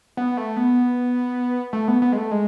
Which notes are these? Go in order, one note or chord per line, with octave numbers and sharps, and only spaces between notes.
B3
A3
B3
A3
B3
B3
G#3
A3
G#3